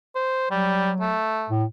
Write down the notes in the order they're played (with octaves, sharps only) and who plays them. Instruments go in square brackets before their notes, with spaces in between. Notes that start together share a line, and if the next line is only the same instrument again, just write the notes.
[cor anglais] C5
[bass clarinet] F#3 [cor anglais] G3
[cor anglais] A3
[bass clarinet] A2